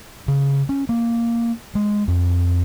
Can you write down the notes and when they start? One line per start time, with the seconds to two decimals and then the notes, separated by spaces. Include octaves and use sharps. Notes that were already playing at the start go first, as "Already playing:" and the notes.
0.28 C#3
0.69 C#4
0.89 A#3
1.75 G#3
2.08 F2